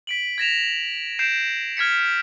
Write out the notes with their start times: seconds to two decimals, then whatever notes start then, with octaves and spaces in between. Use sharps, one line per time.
0.07 B6 D7 F#7
0.38 G#6 A#6 E7 F7
1.19 G6 C7 D7 E7
1.77 F6 G#6 B6 C#7